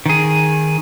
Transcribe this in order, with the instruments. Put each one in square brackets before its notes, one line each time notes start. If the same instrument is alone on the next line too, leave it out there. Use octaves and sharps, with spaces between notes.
[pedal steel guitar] D#3 G#4